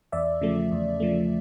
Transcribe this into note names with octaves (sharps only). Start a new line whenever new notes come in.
E2 D5 E5
C#3 F3 A3
E2
C#3 F3 A3